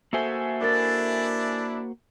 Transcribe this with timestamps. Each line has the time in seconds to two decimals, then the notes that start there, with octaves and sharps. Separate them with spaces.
0.13 A#3 F#4 A4 C5 E5 G#5
0.62 D4 E4 A#4 A6